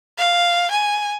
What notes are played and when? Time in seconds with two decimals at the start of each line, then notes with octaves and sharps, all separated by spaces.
0.18 F5
0.71 G#5